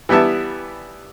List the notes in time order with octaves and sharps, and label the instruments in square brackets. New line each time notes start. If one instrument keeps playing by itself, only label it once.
[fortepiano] E3 G3 B3 E4 A5